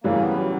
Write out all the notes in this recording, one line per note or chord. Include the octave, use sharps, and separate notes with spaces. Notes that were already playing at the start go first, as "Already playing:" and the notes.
F#2 C#3 E3 G3 A#3 C#4
B3
F#3